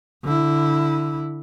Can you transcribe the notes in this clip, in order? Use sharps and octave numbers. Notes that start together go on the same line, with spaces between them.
D3 E4